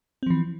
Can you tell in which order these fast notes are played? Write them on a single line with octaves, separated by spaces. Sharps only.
C4 F3 E3